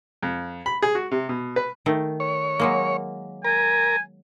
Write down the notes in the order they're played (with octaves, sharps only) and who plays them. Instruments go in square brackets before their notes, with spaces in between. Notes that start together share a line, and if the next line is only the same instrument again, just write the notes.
[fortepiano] F2
B5
G#4
F#4
C3
B2
B4
[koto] D#3 A3
[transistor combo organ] C#5
[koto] F#3 G#3 A#3
[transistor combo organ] A#4 [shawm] G#5